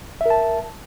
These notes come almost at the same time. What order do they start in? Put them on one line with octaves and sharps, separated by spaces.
E5 A#4 A5